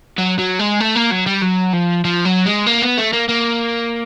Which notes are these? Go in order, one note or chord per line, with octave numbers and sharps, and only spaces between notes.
F#3
F#3
G#3
A3
A#3
F#3
G3
F#3
F3
F3
F#3
G#3
A#3
B3
A3
A#3
A#3